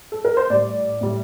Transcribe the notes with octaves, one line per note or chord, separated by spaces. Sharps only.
A4
A#4
C5
A2 G3 D5
A2 G3